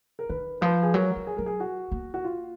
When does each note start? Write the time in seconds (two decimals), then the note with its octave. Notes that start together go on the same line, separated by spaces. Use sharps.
0.19 A#4
0.29 D#3 B4
0.61 F3 B4
0.83 G#4
0.94 F#3 A#4
1.16 F#3
1.27 G#4
1.37 F#3 A#4
1.46 G#4
1.60 F#4
1.92 A#3
2.14 F#4
2.24 F4